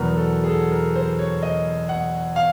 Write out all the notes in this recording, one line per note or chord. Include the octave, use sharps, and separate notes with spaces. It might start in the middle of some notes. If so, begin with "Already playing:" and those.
Already playing: E2 B2 F#3 A#4 B4
A4
G#4
A4
A#4
C5
C#5
D#5
F#5
F5